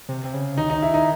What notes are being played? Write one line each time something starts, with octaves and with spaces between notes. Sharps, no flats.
C3
C3
C#3
D#3 D#4
D#4
E4
D#4